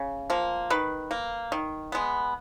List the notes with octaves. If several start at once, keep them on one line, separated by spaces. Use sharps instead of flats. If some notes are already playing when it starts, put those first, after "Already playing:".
Already playing: C#3
F3 A#3
D#3 B4
A#3
D#3
G#3 B3